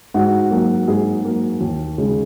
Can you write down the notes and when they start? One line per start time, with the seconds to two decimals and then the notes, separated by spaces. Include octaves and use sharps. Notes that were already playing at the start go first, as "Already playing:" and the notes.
0.14 G#2 F#4
0.51 F#3 A#3
0.87 G#2 G#4
1.24 F#3 A#3
1.61 D#2
1.98 C#3 G#3